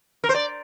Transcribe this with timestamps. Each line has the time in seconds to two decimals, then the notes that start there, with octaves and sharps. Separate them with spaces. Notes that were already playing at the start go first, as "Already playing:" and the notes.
0.24 A#4
0.29 C5
0.35 D5